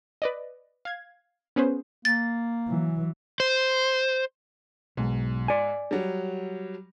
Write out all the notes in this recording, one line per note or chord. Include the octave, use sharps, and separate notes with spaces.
B4 D5 D#5
F5 G#6
B3 C#4 G#4 B4 C5
A#3 A6
E3 F#3
C5
B1 G#2
D5 G#5
F#3 G3